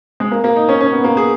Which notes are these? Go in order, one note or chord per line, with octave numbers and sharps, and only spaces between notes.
G#3
A#3
A#3
D#4
C#4
C#4
B3
A#3
G#4